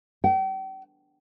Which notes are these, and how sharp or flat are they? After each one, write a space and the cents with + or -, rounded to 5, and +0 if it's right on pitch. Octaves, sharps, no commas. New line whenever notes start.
G5 -40